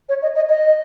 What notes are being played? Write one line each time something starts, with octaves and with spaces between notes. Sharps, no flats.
C#5
D#5
D#5
D#5